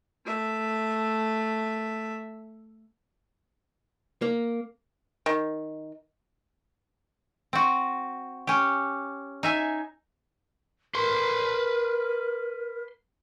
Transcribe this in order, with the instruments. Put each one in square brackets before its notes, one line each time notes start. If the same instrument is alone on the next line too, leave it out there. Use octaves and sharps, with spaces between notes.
[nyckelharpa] A3 E5
[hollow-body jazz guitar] A#3
[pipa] D#3
[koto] C4 F#4
C#4 G4
D#4 E5 G#5
[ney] A#4 [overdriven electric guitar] B4 C6